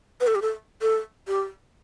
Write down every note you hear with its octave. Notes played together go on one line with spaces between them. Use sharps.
B4
A4
G4
A4
A4
G4